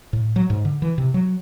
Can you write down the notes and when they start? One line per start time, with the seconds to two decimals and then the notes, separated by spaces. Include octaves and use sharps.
0.13 A2
0.36 F#3
0.50 G#2
0.65 D3
0.82 E3
0.98 C3
1.14 F#3